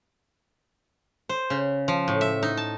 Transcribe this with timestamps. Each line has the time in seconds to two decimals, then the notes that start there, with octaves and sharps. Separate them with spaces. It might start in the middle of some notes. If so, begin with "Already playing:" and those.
1.29 C5
1.50 C#3
1.88 F3
2.08 A2
2.21 E5
2.43 D#4
2.57 A5